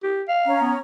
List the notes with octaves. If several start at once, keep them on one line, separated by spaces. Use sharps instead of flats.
G4
F5
C#4 A#5
B3